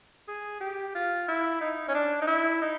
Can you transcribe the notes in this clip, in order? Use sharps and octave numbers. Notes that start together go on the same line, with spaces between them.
G#4
G4
F4
E4
D#4
C#4
D4
D#4
E4
D#4